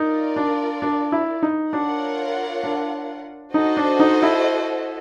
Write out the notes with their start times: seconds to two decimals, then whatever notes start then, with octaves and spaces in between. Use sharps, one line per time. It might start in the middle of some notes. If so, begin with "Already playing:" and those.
Already playing: D#4 F4 A#4 D5
0.36 D4
0.82 D4
1.12 E4
1.43 D#4
1.73 D4 F4 A#4 C#5 F#5
2.64 D4
3.54 D#4 F#4 A4 C5 D#5
3.77 D4
4.00 D#4
4.22 E4